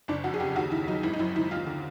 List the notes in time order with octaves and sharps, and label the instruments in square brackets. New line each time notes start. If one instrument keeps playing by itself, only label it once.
[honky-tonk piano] F#1 D4
F2 F#4
G#4
C#3 G4
D#2 F#4
D#3 E4
F#3 D#4
G#1 E4
D#4
F#2 E4
D#3 E4
D#2 F4
D3